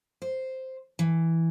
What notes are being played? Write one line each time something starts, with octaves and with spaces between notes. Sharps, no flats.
C5
E3